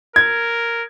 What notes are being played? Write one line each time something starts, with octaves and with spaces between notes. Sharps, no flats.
A#4 G#6